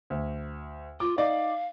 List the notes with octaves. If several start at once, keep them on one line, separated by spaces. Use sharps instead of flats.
D2
F4 D6
D#4 D5 F5